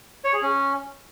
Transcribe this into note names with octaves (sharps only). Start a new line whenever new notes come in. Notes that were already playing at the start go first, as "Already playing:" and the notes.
C#5
G#4
C#4